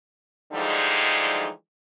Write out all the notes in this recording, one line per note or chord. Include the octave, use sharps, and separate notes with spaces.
D3 E3 F3 G3 G#3 D#4